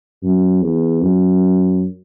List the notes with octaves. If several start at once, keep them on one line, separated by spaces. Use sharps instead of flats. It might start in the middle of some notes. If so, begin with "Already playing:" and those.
F#2
E2
F#2